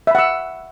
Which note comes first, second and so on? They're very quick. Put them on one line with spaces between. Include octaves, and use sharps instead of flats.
E5 B5 F#5 E6